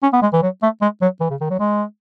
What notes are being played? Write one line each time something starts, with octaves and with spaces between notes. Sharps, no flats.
C#4
B3
G#3
E3
F#3
A3
G#3
F#3
E3
C#3
D#3
F#3
G#3